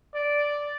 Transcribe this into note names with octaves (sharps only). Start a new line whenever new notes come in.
D5